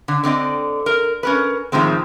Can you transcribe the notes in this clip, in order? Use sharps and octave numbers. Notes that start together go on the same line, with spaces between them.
D3
D3 C4 D5 D#5
A#4
C#4 A#4 B4
A2 D#3 F3 G#3 C4